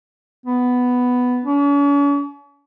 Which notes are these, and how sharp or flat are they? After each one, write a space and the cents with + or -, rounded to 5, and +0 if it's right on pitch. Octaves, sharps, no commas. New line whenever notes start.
B3 +5
C#4 +45